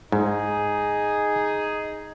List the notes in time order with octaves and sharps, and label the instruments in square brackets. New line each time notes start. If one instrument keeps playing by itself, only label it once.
[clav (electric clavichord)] G#2 [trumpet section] D#4 G#4